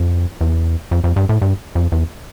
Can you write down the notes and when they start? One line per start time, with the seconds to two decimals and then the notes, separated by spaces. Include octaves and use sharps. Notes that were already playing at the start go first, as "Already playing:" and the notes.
Already playing: F2
0.41 E2
0.91 F2
1.04 F2
1.16 G2
1.29 A2
1.42 G2
1.75 F2
1.92 E2